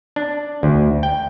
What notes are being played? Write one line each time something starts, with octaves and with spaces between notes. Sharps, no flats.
D4
D2
G5